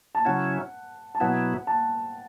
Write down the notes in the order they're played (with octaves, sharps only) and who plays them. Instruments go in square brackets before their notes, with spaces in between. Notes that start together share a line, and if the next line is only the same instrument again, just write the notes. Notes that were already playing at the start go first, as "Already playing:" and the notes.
[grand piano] A5
[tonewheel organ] C#3 F#3 C#4 E4 [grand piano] F#5
[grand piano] A5
[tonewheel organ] B2 F#3 B3 E4 [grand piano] F#5
[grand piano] A5